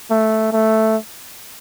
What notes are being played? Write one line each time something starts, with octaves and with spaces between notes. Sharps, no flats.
A3
A3